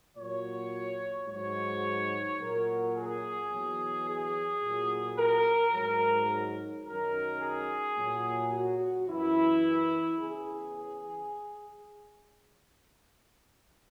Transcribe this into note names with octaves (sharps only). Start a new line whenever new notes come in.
A#2 F#3 C#5
G#2 F#3 C#5
A#2 F#3 A#4
G#4
E2 B2 F#3
G#4
A#2 F#3
A#4
G#2 F#3 A#4
F#2 D#3 F#3 A#4
G#4
A#2 F#3
F#4
F#2 E3 E4
E2 C#3 E3 G#4